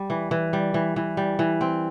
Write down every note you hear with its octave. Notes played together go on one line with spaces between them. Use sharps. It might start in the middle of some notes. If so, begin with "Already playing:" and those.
Already playing: G3
E3
E3
G3
E3
E3
G3
E3
C4